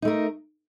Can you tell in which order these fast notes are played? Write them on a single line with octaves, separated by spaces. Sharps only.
D#4 A3 A#4